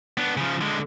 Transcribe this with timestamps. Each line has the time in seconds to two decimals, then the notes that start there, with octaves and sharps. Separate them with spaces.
0.17 B3 D4
0.37 C#3 F3
0.61 D3 G#3